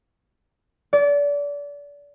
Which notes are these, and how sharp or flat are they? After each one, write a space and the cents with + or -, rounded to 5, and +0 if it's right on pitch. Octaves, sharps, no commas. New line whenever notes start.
D5 -30